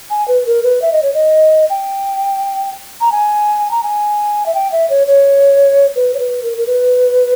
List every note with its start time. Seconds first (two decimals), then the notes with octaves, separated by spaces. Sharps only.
0.10 G#5
0.28 B4
0.47 A#4
0.63 B4
0.82 E5
0.92 D#5
1.03 C#5
1.14 D#5
1.70 G5
3.01 A#5
3.12 G#5
3.71 A#5
3.83 G#5
4.46 E5
4.54 G5
4.72 E5
4.90 C#5
5.07 C#5
5.96 B4
6.14 C#5
6.19 B4
6.43 A#4
6.58 A#4
6.67 B4